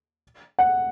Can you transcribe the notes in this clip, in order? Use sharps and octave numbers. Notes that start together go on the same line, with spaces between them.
F#5